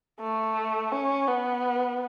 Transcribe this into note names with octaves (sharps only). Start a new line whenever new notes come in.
A3
C#4
B3